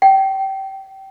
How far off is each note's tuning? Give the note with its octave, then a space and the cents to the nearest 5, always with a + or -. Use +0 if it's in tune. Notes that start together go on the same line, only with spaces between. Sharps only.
G5 -25